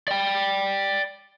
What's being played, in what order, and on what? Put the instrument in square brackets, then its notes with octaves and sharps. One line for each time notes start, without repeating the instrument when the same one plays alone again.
[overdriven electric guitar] D5 G5